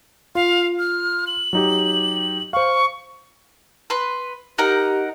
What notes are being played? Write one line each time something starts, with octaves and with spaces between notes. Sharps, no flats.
F4 F5
F6
F#7
F#3 D#4 G4
C5 F5 C#6
B4 C6
D#4 G4 A#4 F#5